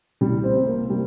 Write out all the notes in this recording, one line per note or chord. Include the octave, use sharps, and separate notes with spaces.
C2 G3
C4
C3
A#3
G3